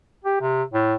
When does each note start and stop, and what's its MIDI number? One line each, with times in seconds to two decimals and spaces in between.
0.25 0.37 67
0.41 0.63 48
0.73 0.95 45